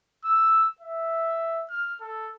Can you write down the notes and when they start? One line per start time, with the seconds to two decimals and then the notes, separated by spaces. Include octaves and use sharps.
0.24 E6
0.80 E5
1.69 F6
2.01 A4